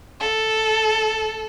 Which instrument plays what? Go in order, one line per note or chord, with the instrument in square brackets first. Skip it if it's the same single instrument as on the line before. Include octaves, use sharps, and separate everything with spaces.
[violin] A4